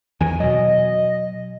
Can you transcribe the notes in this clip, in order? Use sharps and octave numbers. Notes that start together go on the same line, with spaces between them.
E2 D#3 G#5
B2 F#3 D#5